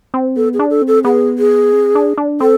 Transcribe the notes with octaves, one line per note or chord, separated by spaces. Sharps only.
C4
B3 A4
G#4
D4
A4
C4
A4
B3 G#4
G#4
C4
D4
D4
C4 A4